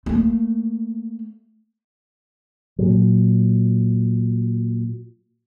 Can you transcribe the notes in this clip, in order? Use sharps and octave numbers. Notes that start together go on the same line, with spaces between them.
A3 A#3
A#2 F#3